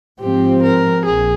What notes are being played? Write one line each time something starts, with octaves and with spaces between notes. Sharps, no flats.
G#2 F3 C4 G4
A#4
A#1 G#4